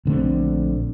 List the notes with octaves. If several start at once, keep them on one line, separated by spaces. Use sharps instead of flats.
A#1 D3 A3 C4